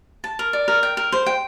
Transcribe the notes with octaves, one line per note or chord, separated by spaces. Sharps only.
A5
A#4
D5
A#4
G5
A#4
C5
G5